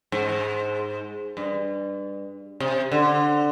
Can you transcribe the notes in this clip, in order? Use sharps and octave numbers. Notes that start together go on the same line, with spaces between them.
G#2
G2
C3
D3